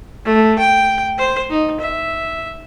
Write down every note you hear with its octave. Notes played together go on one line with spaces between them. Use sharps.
A3
G5
C5
D#4
E5